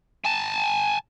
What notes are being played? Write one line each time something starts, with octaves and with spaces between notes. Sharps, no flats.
G#5 A5